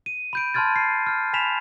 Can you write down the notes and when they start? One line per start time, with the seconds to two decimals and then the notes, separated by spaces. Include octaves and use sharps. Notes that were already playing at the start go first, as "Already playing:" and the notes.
0.06 D#7
0.33 B5 G6 D7
0.54 A5 B5 C6 F6 G#6 A6
0.76 C7
1.06 F6 G6
1.33 G#5 B5 B6 E7 F7